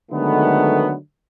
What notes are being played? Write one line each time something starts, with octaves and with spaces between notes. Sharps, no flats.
D3 D#3 F#3 G#3 A3 B3